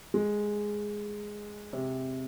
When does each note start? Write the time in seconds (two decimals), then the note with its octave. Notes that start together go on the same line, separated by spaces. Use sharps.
0.14 G#3
1.73 C3